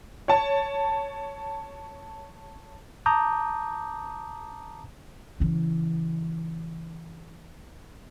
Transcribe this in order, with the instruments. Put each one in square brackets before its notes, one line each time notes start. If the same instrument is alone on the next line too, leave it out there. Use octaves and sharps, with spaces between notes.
[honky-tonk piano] C#5 A5
[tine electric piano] A5 A#5 D6 D#6 G6
[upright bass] C#3 E3